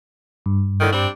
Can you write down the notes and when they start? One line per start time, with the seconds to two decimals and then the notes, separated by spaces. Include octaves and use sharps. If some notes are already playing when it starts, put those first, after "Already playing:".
0.46 G2
0.80 A2 D3 D#3
0.93 G3 C4 D4